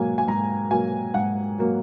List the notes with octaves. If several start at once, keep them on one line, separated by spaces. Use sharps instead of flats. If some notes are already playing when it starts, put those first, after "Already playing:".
Already playing: G#2 F#3 A#3 G#5
G#5
G#2 A#5
F#3 A#3 G#5
G#2 F#5
F#3 A#3